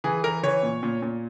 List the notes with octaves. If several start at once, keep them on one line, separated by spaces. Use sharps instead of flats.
E3 G#4
E3 A#4
E3 C#5
A#2
A#2
A#2